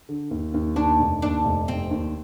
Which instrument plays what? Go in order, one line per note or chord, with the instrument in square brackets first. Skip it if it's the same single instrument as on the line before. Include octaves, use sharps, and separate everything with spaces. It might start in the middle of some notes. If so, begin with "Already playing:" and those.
[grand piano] D3
D#2
D#2
[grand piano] D#2 [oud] D4
[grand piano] F1
[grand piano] D#2 [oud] D4
[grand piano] F1
[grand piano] F1 [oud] C4
[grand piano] D#2